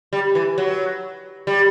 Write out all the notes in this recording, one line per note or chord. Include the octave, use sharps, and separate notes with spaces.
G3
E3
F#3
G3